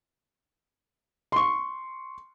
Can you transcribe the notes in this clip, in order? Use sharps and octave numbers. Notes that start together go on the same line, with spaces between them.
C6 C#6